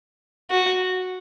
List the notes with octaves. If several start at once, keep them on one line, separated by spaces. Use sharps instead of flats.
F#4